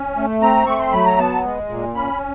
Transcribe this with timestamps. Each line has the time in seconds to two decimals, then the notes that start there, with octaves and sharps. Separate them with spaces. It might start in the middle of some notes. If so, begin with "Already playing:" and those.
Already playing: C#4
0.16 A3
0.42 C4 A#5
0.66 A3 C#6
0.79 C6
0.92 F#3 B5
1.06 A#5
1.18 B3 A5
1.44 G#3
1.69 A#2
1.95 C#4 B5